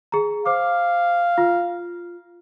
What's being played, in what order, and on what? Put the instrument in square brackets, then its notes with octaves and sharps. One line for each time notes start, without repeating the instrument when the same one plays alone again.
[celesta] G#4 A#5
[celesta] C5 D6 [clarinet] F5
[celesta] F4